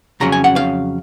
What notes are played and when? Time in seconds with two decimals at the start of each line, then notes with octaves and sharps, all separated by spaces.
0.20 F2 C#3 F#3 C#4 A#5
0.32 G#5
0.44 F#5
0.56 F5